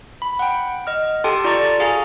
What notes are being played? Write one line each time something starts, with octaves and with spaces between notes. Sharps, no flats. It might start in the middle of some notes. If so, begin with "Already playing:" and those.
B5
F#5 G5
D#5 F6
G4 A4 G5 A5 C6
F4 D5 A5 A#5 C#6 A6
G#4 F5 G#5 A#5